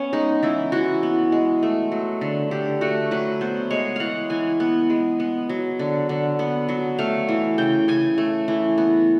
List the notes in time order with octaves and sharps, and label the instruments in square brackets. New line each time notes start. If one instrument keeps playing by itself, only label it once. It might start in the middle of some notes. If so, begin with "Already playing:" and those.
Already playing: [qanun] B3 C#4
G#3 D#4
E3 E4
E3 F#4
B3
G#3
A3
F#3
D3
D3 G4
A3 F#4
F#3 B4
B3 C5
G#3 C#5
E3 F5 F#5
E3 G#5
B3
G#3
B3
F#3
D3
D3
B3
F#3
A3 F5
E3
C#3 G5
C#3 G#5
A3
E3
B3